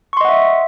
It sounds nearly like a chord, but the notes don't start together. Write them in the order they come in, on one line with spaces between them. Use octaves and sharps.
C#6 C6 D#5 F#5 E5